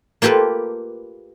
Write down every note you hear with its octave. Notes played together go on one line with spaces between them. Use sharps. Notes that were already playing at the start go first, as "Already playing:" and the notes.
A#3 F4 G4 A4 B4